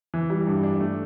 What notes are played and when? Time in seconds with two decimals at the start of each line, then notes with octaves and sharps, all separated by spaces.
0.14 E3
0.30 G3
0.47 G2
0.63 D4
0.80 A3